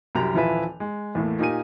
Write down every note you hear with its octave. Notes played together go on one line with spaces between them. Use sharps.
C2 F#2 G4 A#5 F7
D#1 E3 F3 E4 B4 E5
G#3
E2 A2 A3 A#3
A#2 D#4 G4 A#4 G#5 D#7